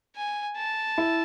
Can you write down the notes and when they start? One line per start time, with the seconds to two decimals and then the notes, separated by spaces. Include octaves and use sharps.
0.16 G#5
0.57 A5
0.98 E4